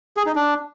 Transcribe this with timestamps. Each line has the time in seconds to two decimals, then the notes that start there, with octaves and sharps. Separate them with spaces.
0.17 G#4
0.26 D#4
0.36 D4